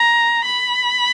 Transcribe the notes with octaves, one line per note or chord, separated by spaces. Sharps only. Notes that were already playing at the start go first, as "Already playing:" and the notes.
Already playing: A#5
B5